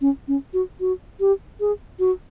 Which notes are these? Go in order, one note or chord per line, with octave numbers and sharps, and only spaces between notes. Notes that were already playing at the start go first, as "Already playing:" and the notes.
C#4
C#4
F#4
F#4
G4
G#4
F#4